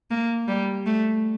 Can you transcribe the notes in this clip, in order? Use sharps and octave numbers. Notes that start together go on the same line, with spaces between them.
A#3
G3
A3